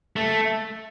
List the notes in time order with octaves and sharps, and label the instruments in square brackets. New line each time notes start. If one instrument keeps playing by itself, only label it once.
[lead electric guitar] A3